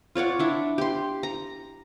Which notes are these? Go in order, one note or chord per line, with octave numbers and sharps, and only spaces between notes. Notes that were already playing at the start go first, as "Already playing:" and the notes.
F4 C#5 D5 F#5
D4 E4
G4 C6
A#5